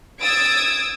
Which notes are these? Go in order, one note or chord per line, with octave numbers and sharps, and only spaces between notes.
D#6 E6 G#6 A6 D7